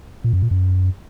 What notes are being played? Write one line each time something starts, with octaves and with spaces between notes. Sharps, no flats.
A#2
F#2
A#2
F#2